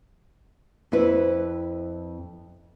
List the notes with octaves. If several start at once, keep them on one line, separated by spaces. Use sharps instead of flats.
F2 C4 E4 B4